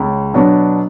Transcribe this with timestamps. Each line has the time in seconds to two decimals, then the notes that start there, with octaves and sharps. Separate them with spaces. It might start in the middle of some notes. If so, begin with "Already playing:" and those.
Already playing: C#2
0.34 B2 F#3 B3 D4